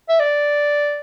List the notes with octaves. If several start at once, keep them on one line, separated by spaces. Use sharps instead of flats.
E5
D5